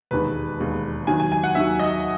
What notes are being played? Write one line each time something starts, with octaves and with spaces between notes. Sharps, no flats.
E1 D#2 D#3 G#3 B4
E1 D#2 D#3 G#3
D#2 D#3 F#3 G#5
G#5
G#5
F#5
D#2 D#3 F#3 E5
D#5